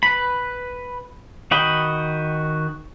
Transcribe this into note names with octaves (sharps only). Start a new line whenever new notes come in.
B4 B5
D#3 F#4 D#5 G5 B5